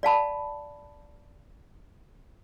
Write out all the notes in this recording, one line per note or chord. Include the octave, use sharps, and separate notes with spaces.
D5 F5 A5 B5